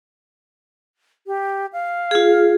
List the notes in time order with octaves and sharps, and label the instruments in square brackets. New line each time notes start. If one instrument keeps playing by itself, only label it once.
[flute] G4
F5
[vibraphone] F4 G#4